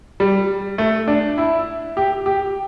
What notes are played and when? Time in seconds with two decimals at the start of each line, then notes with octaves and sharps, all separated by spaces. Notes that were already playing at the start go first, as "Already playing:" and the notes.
0.20 G3
0.78 A3
1.08 D4
1.38 E4
1.97 G4
2.26 G4